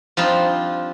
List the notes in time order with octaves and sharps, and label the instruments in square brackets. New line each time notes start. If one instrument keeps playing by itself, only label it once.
[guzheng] F3 G3 C4 D4 D#4 F4